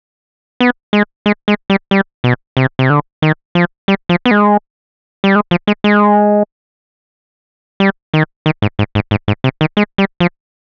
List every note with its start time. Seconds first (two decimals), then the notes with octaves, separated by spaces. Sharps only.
0.60 B3
0.93 G#3
1.26 G#3
1.48 G#3
1.70 G3
1.91 G3
2.24 B2
2.57 C3
2.79 C3
2.90 D3
3.22 D#3
3.55 F3
3.88 G3
4.09 F3
4.26 B3
4.31 G#3
5.24 G3
5.35 G#3
5.51 F3
5.67 G#3
5.84 G#3
7.80 G3
8.14 D#3
8.46 D#3
8.62 G#2
8.79 G#2
8.95 G#2
9.11 G#2
9.28 G#2
9.44 C3
9.61 D#3
9.77 G#3
9.98 G3
10.20 F3